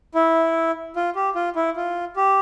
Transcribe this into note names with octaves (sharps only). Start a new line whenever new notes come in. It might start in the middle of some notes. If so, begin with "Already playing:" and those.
E4
F4
G4
F4
E4
F4
G4